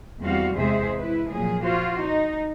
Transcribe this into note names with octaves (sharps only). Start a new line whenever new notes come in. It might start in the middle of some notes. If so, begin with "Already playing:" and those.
E2 G3 C4 F#4 F5
E2 C3 G#3 G#4 C5 E5
E4 B4
A#2 F3 F#3 G#4
F4 F#4 C5
D#4